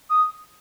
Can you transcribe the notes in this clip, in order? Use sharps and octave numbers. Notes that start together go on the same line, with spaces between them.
D#6